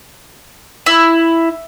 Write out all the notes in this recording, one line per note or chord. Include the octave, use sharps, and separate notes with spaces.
E4